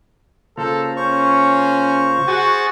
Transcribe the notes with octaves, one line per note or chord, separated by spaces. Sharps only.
C#3 A#3 F4 A4 C5
C#4 C5 C#6
F#4 G#4 G#5 A6